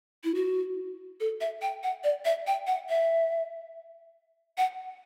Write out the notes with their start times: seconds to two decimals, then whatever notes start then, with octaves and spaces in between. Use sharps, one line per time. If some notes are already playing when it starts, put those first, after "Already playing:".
0.24 E4
0.35 F#4
1.20 A4
1.41 E5
1.62 G5
1.83 F#5
2.04 D5
2.25 E5
2.47 G5
2.67 F#5
2.89 E5
4.58 F#5